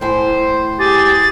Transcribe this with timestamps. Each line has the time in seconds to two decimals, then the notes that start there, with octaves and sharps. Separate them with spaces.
0.01 A2 E4 C5 G#5
0.79 G4 G#4 A6